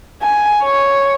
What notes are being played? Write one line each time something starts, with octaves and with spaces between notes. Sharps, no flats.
G#5
C#5